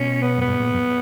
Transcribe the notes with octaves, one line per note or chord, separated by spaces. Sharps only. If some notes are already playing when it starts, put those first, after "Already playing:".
Already playing: B2 C#4
B3
F#2 B3
G2
A#2
F#2